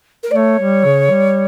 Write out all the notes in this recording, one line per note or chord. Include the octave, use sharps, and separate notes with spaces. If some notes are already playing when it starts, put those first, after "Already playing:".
A#4
A3 D5
C#5
G3
C#3
G3